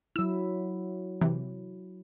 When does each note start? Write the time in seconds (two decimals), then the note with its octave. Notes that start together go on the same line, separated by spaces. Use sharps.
0.16 F#3 E4 E6
1.21 C3 E3